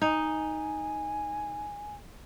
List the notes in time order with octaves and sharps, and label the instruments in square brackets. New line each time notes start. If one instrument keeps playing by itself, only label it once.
[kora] D#4 [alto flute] G#5